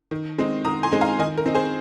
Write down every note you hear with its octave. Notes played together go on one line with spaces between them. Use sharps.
D#3
G#3 C4 D#4
D#3 A#5 D#6
G#5 C6
G#3 C4 D#4
F5 A#5
D#3 D#5 G#5
A#4
C4 D#4
G#4 C5